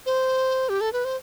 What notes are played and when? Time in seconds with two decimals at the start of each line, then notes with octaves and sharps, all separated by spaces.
0.06 C5
0.69 G4
0.81 A4
0.93 B4
1.05 C5